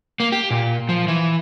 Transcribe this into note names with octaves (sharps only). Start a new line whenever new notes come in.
A#3
G4
A#2
F3
E3